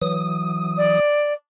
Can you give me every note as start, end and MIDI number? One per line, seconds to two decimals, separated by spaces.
0.02 1.00 52
0.02 1.00 54
0.02 1.00 87
0.77 1.33 74